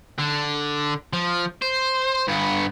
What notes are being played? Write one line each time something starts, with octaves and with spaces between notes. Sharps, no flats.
D3
F3
C5
G2 B3